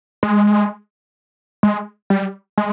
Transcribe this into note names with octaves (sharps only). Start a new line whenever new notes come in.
G#3
G#3
G3
G#3